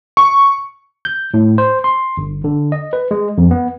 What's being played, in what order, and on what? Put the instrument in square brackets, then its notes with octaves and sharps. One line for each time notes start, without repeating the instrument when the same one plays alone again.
[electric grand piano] C#6
[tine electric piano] G6
A2
C5
C6
G1
D3
D#5
B4
G#3
F2
B3